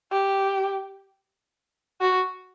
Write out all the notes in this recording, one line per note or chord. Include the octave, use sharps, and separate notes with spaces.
G4
F#4